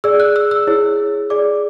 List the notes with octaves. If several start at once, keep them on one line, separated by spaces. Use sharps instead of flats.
G#4 D5 E6
F#6
E6
E6
E4 G#4 C#5
G#4 D5 D6